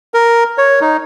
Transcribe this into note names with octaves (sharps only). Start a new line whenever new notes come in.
A#4
C#5
D#4